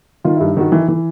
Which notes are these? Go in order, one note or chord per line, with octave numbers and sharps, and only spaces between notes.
D#3 F4
G2 E4
D#3 F#4
E3
E3